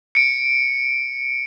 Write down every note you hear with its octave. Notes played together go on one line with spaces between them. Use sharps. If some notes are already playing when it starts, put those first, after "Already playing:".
C#7 D7